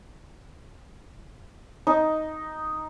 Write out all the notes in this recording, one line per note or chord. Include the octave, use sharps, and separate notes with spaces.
D#4